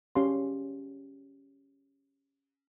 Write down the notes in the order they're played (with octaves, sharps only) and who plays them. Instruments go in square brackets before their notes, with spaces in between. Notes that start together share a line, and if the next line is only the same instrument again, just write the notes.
[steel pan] C#4 G4 F5 C6